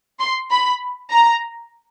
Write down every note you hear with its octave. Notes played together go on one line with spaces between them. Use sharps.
C6
B5
A#5